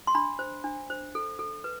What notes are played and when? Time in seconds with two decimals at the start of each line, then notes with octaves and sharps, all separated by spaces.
0.07 C6
0.15 D4 B5
0.39 C5
0.64 D4
0.90 C5
1.15 A4
1.39 A4
1.64 B4